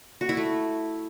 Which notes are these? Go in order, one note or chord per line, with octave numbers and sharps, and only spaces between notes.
F#4
E4
A3